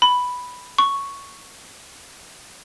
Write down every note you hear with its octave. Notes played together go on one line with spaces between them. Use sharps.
B5
C#6